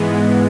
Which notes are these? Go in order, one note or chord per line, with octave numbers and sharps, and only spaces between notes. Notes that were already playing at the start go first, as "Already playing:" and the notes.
Already playing: G#2 E3 G#3 B3